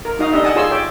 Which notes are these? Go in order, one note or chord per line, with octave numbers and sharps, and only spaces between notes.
A#4
D#4 F#4 D#5 F5 D#6
D4 G4 D#5 E5
D#5 F#5 G#5 A5 D#6
F4 G#4 C#5 A5 C6 E6
C#5 D5 E5 G5